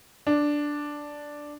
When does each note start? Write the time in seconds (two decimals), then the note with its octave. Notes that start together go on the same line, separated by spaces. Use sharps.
0.27 D4